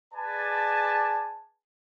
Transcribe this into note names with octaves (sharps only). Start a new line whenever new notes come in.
G#4 B4 D5 G#5 A5